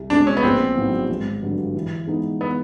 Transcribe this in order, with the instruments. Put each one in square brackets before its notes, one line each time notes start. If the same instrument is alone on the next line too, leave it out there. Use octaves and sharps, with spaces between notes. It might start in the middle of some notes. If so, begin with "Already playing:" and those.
Already playing: [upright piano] C2
[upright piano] B2 G#3 C4 [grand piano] D4
[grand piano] C#4
B3
[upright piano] A#1 [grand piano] C4
[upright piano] A2 F#3 B3 D#4
G#1
G2 D3 F#3
E3
G#3 B3 D#4
[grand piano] B3